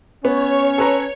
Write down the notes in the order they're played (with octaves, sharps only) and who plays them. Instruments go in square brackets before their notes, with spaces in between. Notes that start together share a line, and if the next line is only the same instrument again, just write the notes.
[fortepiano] B3 [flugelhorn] C#4 [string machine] C#5
[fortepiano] A4 B4 A#5